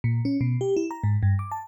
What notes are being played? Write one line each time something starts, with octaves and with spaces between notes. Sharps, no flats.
A#2
C#4
B2
G4
E4
A#5
G#2
G2
D6
A5